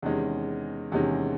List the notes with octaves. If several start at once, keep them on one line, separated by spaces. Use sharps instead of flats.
E2 C3 D#3 G#3 C#4
E2 C3 D#3 G#3 C#4